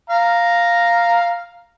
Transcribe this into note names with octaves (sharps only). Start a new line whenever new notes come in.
F5 A#5